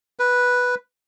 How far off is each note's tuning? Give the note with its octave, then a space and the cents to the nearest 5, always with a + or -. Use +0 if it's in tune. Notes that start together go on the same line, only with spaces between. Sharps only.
B4 -5